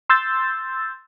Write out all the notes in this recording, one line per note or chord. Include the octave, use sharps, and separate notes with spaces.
C6 E6 G6 A6